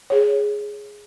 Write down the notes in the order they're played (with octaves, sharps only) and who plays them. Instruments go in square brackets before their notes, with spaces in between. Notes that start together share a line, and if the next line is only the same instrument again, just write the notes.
[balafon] G#4 C#5